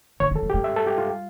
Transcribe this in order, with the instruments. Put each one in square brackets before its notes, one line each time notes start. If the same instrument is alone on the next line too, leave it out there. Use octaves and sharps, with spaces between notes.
[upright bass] D3 [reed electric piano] C#5
[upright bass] E3 [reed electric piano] A4
[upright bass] F3
[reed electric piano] G4
[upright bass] G3
[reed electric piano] E5
A4
G4
F4